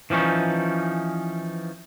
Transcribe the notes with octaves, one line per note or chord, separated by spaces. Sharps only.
E3 F3 G3 C#4 D#4